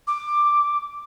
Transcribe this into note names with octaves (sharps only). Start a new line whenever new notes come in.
D6